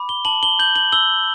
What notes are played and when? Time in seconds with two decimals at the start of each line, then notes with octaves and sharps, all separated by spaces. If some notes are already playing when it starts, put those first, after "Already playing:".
Already playing: B5 D6
0.09 G7
0.25 A5 F#7
0.43 G7
0.59 G6 F#7
0.76 F#7
0.93 E6 G7